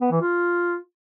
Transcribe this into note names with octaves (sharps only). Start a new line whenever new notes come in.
B3
E3
F4